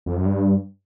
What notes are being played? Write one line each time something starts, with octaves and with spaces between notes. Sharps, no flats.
F2
F#2
G2